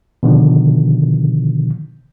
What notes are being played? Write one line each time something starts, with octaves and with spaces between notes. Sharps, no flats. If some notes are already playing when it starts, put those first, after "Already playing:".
B2 D3 D#3 F3